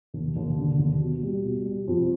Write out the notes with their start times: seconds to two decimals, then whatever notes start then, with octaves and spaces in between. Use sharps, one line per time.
0.14 D#2
0.36 D#2
0.58 D3
0.79 D#2
1.01 B2
1.23 G3
1.44 B2
1.66 G3
1.88 F2